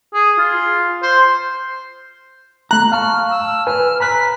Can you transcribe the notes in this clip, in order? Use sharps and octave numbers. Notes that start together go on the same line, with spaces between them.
G#4
F4
C5
A3 A#5 F#6
F5 A5 C#6 F6
E6
B4 G#5 F6
A#5 B5 F#6 B6